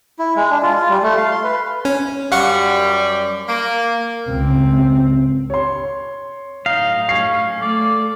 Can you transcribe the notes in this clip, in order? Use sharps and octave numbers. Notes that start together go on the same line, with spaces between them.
E4
G#3
D4
F4
F4
G3
A3
F5
C6
B4
C#4
F#2 G3 F5 F#5 C#6
A#3
C#2 C4
C#5 C6
A2 F#3 D#4 F5
C#4 C7
A3 D5